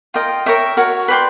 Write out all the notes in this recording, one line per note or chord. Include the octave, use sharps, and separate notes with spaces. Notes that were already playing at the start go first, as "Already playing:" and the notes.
F4 A#4 D#5 G5
A#4 C#5 E5 G5
F#4 A#4 C#5
B4 D5 G5 C6